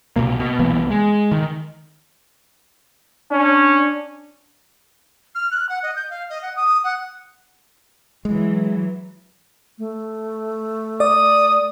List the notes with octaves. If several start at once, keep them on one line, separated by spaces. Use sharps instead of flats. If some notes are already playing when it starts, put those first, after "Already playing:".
C2 G2 B2 A#3
B2
C2 E3 A#3 B3
G#3
D#3
C#4 D4
F6
F#6
F#5
D#5
G6
F5
D#5
F#5
D#6
F#5
E3 F#3 G#3
A3
D5 D#6